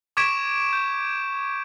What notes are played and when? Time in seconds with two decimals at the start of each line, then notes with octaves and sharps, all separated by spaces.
0.17 C#6 D6 G#6 B6 D7 E7
0.73 G6